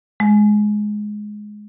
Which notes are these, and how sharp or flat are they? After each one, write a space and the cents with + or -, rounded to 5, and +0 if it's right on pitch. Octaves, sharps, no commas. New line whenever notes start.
G#3 +10